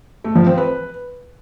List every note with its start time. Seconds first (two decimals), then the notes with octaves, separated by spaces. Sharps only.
0.24 A3
0.35 F3
0.46 C4
0.57 B4